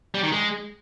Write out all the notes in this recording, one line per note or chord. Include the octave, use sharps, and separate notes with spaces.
G3
D#3
G#3